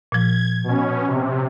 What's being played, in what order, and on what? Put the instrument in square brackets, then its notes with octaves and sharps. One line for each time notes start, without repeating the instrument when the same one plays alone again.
[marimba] A#2 F3 [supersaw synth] G#6
[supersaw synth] B2 C#4
C3